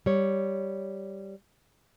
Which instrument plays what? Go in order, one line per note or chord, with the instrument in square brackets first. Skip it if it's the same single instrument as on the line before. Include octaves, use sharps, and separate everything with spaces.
[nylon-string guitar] G3 C#5